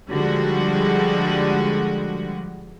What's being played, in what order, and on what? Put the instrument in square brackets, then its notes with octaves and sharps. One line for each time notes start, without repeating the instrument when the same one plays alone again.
[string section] D3 F3 G3 G#3 F#4